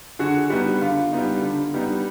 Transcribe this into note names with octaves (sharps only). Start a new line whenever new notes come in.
D3 F#4 G#4
G3 B3 D#4 F#4
D3 F4
G3 B3 D#4
D3
G3 B3 D#4